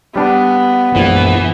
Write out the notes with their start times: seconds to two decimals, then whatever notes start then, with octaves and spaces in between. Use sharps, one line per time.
0.16 G3 B3 D4
0.95 A#1 F#2 E3 G#3